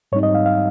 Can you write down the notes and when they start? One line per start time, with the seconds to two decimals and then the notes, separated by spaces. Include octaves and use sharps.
0.12 G#2 G3 C4 D#4 C#5
0.23 D#5
0.35 F5
0.46 F5